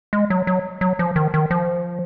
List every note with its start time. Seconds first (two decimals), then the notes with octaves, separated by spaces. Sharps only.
0.13 G#3
0.30 F#3
0.47 F#3
0.81 F#3
0.99 F3
1.16 D#3
1.34 D#3
1.51 F3